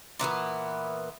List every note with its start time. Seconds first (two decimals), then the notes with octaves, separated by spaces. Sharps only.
0.19 A#2 E3 A3 B3